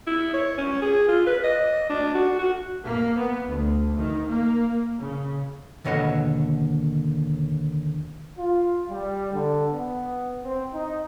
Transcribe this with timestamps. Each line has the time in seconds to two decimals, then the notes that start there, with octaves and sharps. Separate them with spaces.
0.07 E4
0.34 C#5
0.58 C#4
0.82 G#4
1.08 F4
1.27 B4
1.44 D#5
1.90 D4
2.15 F#4
2.39 F#4
2.84 A#3
3.19 B3
3.48 D2
3.99 D#3
4.28 A#3
4.99 C#3
5.85 D#2 B2 D3 C#5 D#5 F#5
8.38 F4
8.89 G3
9.33 D3
9.73 B3
10.44 C4
10.74 D#4